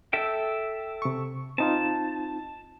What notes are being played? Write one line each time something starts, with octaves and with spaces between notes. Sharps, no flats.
A4 E5 G5
C3 C#6
C4 D#4 F4 A5